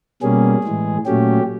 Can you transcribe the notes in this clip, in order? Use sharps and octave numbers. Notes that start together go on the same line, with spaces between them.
B2 G3 A#3 C#4 G#4
A2 E3 G#3
A#2 F#3 A3 C#4 G4